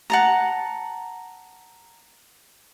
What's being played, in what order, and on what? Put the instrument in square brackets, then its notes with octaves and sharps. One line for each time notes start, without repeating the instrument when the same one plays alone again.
[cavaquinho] F#5 A5 A#5